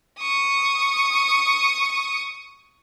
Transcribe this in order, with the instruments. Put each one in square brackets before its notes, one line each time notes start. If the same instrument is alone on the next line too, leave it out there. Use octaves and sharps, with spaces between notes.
[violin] C#6 D#6